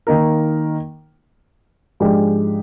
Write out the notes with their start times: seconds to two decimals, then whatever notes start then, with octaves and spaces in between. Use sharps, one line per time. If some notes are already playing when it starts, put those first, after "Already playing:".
0.07 D#3 A#3 D#4 A#4
2.00 G#2 F3 G#3 D4 G4